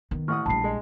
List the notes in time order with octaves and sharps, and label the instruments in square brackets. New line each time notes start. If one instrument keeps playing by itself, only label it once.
[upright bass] D#3 B3
[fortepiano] A1 F#5 D#6 [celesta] C#6 F6
[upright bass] A#1 G3 [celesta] A5 B5 C7
[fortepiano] G#3